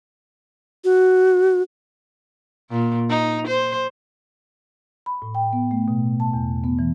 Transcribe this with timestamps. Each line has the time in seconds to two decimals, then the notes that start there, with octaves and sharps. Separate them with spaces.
0.84 F#4
2.70 A#2
3.09 D#4
3.48 C5
5.06 B5
5.22 A2
5.35 G5
5.53 B3
5.71 A3
5.88 B2
6.20 A5
6.34 E2
6.64 B3
6.79 E3